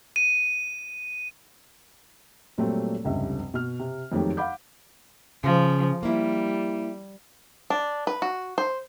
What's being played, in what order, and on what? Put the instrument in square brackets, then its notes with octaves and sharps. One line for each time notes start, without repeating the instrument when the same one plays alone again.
[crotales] D#7
[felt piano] A#2 F#3 G3 A3 C4
F1 C#2 G2 E5
B2 F6
C3
F2 D#3 F#3 G#3 A3 G4
F5 F#5 B5 D6 G6
[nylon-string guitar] C#3 [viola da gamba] F3
[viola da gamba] G3 [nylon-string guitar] A#3 E4
[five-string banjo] D4
B4
F#4
C5